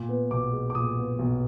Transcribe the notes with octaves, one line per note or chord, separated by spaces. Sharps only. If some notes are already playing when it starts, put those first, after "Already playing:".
Already playing: A#2
B3
B1 D6
G#3
D6
A#2 D#6
B3
B1